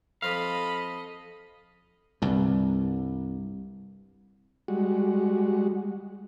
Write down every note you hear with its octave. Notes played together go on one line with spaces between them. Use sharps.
F2 A4 C5 D#5 F5 B5
C2 G2
G3 G#3 F#4